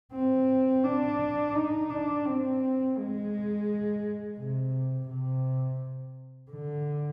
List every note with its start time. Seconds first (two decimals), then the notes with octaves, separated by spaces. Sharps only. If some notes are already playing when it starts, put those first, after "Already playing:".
0.12 C4
0.84 D4
1.54 D#4
1.90 D4
2.25 C4
2.96 G#3
4.38 C3
5.09 C3
6.52 D3